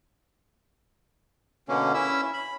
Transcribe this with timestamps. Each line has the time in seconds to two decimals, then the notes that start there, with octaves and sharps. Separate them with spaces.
1.69 B2 D3 A#3 C#4
1.94 C#4 E4 E5 E6
2.34 B5